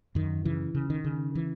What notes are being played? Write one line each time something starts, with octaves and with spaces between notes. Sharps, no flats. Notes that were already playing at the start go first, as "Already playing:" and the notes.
F#2 D#3
C#3 E3
C#3
D#3
C#3
E3